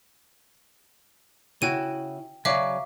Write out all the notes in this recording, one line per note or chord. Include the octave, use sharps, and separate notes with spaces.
C#3 E4 F#4 G5 D#7
C#3 F#3 D5 E5 F5 D6